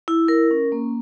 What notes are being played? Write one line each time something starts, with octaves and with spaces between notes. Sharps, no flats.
E4
A#4
C#4
A#3